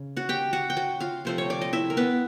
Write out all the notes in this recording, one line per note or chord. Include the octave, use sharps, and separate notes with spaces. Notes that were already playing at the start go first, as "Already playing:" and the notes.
Already playing: C#3
F#4 F#5
G4 G5
F#4 F#5
G5
F#4 F#5
F4 F5
C3 F3 A3 C5
C#5
D5
D#5
E4 E5
A#4
B3 B4